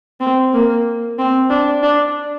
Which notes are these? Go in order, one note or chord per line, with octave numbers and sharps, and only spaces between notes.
C4
A#3
C4
D4
D4